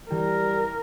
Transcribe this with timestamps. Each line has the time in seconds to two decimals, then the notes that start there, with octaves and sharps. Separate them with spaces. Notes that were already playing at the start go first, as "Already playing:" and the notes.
0.10 E3 G3 A#4 G5